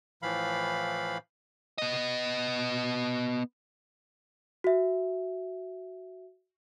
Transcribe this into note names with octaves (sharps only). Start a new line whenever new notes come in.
A2 E3 F3 F5 B5
B3 D#5
F#4 E5